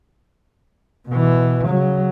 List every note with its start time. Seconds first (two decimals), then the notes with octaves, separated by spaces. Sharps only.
1.09 B2 E3
1.67 C#3 F#3